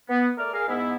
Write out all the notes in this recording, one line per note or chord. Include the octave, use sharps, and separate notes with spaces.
B3
A3 A#4 D5 F6
G#4 A#4 F5
G#2 B3 E4